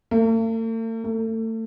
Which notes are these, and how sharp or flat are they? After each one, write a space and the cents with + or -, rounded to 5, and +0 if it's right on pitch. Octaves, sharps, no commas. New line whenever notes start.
A3 +45
A3 +30